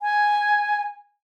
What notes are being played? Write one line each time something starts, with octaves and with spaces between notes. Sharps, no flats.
G#5